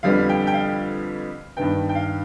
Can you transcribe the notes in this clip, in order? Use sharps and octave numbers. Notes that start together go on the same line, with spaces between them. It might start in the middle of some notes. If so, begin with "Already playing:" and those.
F2 D3 G3 B3 F5
G5
G5
F5
G2 D#3 B3 G5
G5
F5